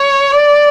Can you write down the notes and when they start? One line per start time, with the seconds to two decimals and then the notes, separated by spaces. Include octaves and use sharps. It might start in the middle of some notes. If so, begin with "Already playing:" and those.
Already playing: C#5
0.32 D5